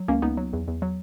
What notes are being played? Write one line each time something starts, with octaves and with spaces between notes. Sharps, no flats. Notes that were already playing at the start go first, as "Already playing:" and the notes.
Already playing: F#3
C#2 A#3 C#4
C#2 B3 D#4
F#3
E2
E2
F#3